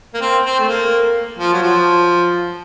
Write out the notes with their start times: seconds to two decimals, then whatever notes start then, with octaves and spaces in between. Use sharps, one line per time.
0.14 A#3
0.21 C4
0.45 C4
0.59 A3
0.68 A#3
1.39 F3
1.53 F#3
1.62 F3